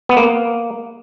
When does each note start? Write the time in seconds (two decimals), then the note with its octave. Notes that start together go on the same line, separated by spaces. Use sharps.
0.09 B3
0.17 A#3